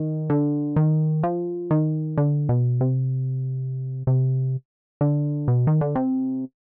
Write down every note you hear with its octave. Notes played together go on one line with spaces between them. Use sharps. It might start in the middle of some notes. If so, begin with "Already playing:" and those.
Already playing: D#3
D3
D#3
F3
D#3
D3
B2
C3
C3
D3
B2
D#3
D3
C3